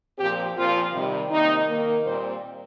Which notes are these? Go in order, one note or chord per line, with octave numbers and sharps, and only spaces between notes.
A#2 F3 C4 G4
A#2 F3 C4 F4
C3 D#3 G3
C3 D#3 A#3 D#4
D#3 A#3
A#2 G3 C4 C5